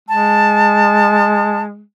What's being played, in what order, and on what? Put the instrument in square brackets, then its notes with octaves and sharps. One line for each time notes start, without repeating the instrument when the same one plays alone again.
[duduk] G#3 [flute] A5